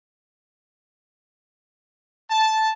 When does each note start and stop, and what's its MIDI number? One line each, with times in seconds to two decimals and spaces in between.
2.29 2.72 81